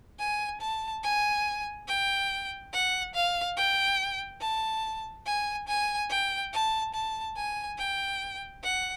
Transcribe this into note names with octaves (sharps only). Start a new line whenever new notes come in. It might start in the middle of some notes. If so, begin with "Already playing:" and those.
G#5
A5
G#5
G5
F#5
F5
G5
A5
G#5
G#5
G5
A5
A5
G#5
G5
F#5